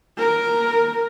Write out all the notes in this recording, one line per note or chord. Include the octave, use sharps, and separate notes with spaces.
A#4